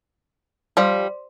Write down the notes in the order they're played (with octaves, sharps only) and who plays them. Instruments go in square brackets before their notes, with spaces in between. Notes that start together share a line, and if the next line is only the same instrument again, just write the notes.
[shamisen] F3 [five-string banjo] G3